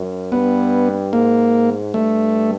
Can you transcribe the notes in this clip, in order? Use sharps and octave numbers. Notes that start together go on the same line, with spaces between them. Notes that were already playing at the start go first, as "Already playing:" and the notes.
Already playing: F#2
G2 B3
G#2 A#3
G2 A3